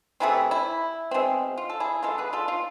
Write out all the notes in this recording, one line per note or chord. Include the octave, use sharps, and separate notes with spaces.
C3 E3 A3 C4 E4 G#4
E4
B2 G#3 C4
F4
A4
E4 G#4
D3 G#3 B3 F4 A4
G#4 B4
F4 A4
F4